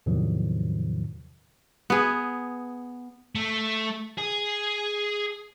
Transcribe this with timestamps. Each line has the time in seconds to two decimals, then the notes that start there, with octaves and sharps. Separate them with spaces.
0.06 E2 A2 C3 D#3 F3 F#3
1.90 B3 G#4
3.35 A3
4.18 G#4